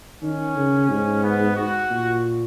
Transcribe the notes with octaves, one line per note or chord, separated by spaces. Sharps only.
D#3 C#4
C#3
G#2
B3
F#4
A#2